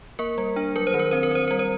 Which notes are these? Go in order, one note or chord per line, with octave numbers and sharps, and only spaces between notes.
A#3 A#4
G3
D4
F#3 A#4
C5
D#3
A#4
C4 C5
A#4
C4 C5
G3 A#4
C5